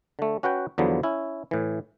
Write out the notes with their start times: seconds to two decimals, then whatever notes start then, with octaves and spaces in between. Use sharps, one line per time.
0.19 D3 A3
0.43 C#4 F#4 B4 F#5 G5
0.78 E2 D3 F3 F#3 B3
1.03 C#4 E4
1.51 A2 E3